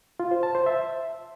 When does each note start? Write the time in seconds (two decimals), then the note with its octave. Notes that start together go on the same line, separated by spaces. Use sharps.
0.20 F4
0.31 C5
0.43 A5
0.55 C5
0.66 E5